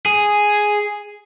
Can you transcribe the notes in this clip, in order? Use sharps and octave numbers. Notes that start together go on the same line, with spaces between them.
G#4